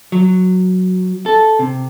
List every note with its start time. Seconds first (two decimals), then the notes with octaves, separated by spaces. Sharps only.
0.12 F#3
1.26 A4
1.59 C3